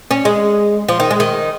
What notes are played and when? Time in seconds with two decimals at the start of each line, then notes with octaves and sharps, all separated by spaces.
0.11 C#4
0.25 G#3
0.88 F3
1.00 D#3
1.11 G#3
1.20 D#3